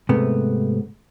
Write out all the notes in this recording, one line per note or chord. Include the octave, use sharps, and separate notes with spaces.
G#2 C3 A3 B3